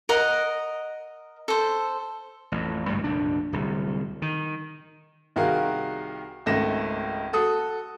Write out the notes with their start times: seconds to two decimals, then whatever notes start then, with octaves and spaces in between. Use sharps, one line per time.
0.09 A#4 D#5 F#5
1.48 A4 C5
2.52 A1 F2
2.88 F#1 D2 G2 A3
3.04 F1 A#1 D4
3.52 D1 C2
4.22 D#3
5.36 C2 D#3 F#4 G#4 A#4 F5
6.46 G#1 C#2 A3 A#6 E7
7.33 F#4 A4 D#6